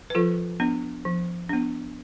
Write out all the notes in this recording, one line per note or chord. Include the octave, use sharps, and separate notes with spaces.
B4
F3 F4 A4
B3 D4
F3
B3 D4